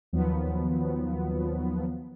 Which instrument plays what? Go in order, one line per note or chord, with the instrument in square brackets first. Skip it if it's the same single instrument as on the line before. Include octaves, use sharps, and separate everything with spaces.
[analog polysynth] D#2 D#3 F3 F#3 B3